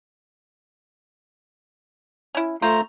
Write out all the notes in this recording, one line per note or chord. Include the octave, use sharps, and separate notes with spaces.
C#4 E4
A3 F4 C5 A#5